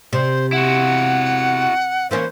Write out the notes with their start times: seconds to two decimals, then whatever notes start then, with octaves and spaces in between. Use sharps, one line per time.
0.13 C3 C5
0.53 E4 F#4 F#5
2.11 E3 A#3 C#4 C5